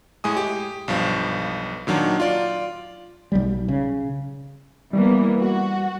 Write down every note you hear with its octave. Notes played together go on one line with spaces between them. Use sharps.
A2 G#3 G#5 D#6
G4
B1 G2 F3
A#2 D#3 F#3 D4
F4 D5
B1 F#3 G3
C#3
E3 G3 A#3 B3
F#4